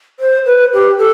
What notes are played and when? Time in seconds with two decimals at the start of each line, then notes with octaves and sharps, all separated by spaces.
0.19 C5
0.45 B4
0.73 G4
0.98 A4